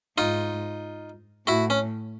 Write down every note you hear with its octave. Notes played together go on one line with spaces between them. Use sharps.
G#2 D#4 F4
A2 E4 F#4
C#4